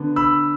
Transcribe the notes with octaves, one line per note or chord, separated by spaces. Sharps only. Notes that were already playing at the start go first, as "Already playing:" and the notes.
Already playing: D3 B3 D4
B5 E6